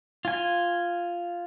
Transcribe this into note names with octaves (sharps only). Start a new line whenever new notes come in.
F4 G#5